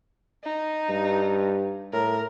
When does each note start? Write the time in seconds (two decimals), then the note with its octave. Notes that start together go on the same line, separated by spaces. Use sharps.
0.44 D#4
0.89 G2
1.93 A2 A#4